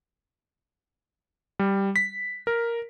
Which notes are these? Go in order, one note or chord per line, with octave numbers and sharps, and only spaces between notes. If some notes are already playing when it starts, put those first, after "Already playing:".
G3
B6
A#4